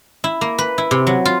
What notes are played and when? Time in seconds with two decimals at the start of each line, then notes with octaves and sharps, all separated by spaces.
0.24 E4
0.41 A#3
0.58 B4
0.78 E4
0.91 C3
1.07 F#3
1.25 F4